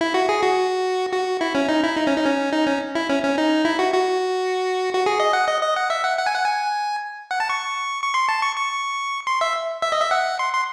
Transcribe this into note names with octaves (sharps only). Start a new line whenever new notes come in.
E4
F#4
G#4
F#4
F#4
E4
C#4
D#4
E4
D#4
C#4
D#4
C#4
D#4
C#4
E4
C#4
C#4
D#4
E4
F#4
F#4
F#4
G#4
D#5
F#5
D#5
D#5
F#5
E5
F#5
F#5
G#5
F#5
G#5
F#5
A5
C#6
C#6
C6
A5
C#6
C#6
C6
E5
E5
D#5
E5
F#5
C6
C6